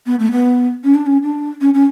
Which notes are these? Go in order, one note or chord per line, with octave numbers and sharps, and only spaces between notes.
B3
A3
B3
C#4
D4
C#4
D4
C#4
C#4